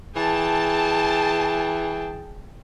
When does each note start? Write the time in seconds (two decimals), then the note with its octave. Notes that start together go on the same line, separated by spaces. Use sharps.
0.16 E3 G#4 G5 A5